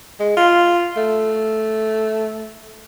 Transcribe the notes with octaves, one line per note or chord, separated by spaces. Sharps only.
G#3
F4
A3